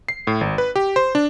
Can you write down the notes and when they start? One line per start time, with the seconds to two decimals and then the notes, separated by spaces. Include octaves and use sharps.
0.09 C7
0.27 A2
0.41 G#1
0.58 B4
0.76 G4
0.96 C5
1.15 D4